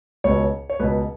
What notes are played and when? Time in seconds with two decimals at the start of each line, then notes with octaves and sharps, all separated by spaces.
0.24 C#2 B2 C#5
0.70 C#5
0.80 C#2 B2 B4